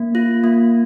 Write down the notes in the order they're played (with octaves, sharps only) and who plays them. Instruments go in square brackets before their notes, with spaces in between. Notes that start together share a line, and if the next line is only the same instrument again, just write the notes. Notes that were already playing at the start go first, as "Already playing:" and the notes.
Already playing: [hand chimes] A#3
F4
A#3